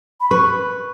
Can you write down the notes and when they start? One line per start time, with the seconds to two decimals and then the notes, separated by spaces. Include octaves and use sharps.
0.21 B5
0.30 B4 C#6